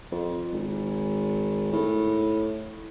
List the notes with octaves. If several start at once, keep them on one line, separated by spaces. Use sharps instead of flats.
F2
G#1
A2